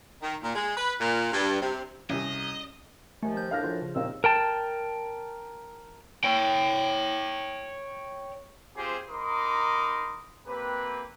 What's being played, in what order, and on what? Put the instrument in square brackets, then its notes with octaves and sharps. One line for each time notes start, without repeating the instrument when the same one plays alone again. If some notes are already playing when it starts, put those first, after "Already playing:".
[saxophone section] D#3
A#2
G#3
B4
A#2
G2
C3
[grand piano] C2 [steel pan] C#4 G4 [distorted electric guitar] D#5
[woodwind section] D#2 D#3 F3 [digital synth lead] A3 [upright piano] G#5
[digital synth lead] G6
[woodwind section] F#2 A2 D4 [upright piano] F5 F6 A#6
[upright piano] F3 C5
[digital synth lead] C#3
[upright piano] A#1 C4 F5 [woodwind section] D#2 D#3 E6
[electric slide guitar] A#4 G5 A5
[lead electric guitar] C#5 G5
[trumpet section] C4 F4 G4 G#4 C5
D#4 A#4 B5 C6 D6 D#6
A#3 C4 G4 B4